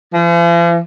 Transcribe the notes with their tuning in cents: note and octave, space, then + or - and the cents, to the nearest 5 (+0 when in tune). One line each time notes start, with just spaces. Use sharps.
F3 -45